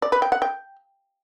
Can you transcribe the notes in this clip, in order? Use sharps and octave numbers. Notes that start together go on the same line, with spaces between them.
D5
B4
G5
F#5
G5